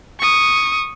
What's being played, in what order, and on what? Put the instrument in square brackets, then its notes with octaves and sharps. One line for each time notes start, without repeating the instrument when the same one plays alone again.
[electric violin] C#6 D#6